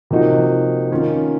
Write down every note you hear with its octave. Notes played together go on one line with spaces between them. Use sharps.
C3 F3 A#3 D#4 F#4
D#3 A#3 C#4 F4